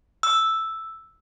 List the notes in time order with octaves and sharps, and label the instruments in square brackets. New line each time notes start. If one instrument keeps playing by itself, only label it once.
[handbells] E6